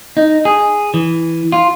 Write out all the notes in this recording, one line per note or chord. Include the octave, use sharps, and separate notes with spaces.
D#4
G#4
E3
F4